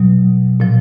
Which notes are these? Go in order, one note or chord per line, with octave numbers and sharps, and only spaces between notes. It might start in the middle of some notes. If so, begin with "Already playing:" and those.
Already playing: B2 F#3
A#2 F3